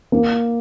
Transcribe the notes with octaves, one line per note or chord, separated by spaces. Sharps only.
A#3